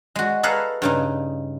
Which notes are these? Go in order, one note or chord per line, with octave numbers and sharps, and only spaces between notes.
G#3 F#4
G#4 A4 B4 F5 F#5 A#5
G2 C#3 D#4